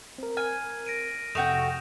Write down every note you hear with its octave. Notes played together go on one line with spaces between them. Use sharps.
C4 A#4
G#5 F6 D#7
A#6 D7 D#7
F2 C3 A3 F#4 G5 D#6 E7 F7